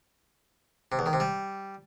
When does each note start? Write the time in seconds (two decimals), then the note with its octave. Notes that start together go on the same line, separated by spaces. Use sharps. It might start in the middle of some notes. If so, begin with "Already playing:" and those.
0.92 C3
0.99 E2
1.06 D#3
1.13 C3
1.20 G3